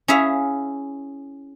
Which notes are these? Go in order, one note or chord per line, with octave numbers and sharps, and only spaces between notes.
C#4 E4 G#4 E5 F5